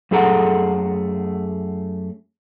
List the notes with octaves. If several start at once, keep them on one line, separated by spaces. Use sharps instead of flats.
F#2 A3 G#4 A4 F#5 A#5